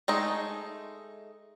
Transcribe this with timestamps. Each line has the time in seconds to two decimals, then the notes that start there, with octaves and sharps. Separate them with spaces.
0.08 G#3 A3 D#4